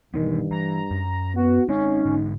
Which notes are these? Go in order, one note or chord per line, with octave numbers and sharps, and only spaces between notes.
G2 B2 D#3 E3 B3
E3 A#5
F#2
B3 F#4
G#3 C4 C#4 D#4
G#2 D3 G#3